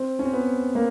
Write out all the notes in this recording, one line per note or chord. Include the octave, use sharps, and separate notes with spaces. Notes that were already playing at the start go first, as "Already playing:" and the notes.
Already playing: C4
C#4
C4
B3
A#3